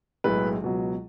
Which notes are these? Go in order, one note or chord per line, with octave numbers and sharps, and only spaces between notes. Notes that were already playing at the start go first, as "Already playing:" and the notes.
B1 A2 G#3 B4
C#2 B2 F#3